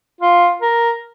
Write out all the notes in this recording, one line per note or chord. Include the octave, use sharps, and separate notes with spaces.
F4
A#4